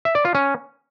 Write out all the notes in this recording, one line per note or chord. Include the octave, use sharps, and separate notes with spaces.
E5
D5
F4
C#4